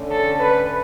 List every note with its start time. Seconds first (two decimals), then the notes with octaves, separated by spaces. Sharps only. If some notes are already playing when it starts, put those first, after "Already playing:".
Already playing: D3 A3 C#4
0.11 A4
0.40 B4